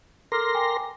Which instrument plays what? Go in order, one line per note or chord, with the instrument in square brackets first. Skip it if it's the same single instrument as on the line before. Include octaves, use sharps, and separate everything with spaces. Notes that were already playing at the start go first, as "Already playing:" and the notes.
[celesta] A4 D6 F6 [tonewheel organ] A#4 C6 A#6
[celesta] G5 G#5 D6